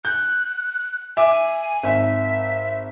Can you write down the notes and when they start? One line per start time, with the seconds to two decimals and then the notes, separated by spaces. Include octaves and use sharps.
0.05 F#6 G6
1.17 E5 G#5 D6
1.83 G#1 E5